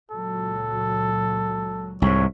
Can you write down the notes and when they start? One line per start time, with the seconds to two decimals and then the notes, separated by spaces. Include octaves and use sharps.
0.11 C#2 A#2 F#3 A4
2.02 C2 G#2 C#5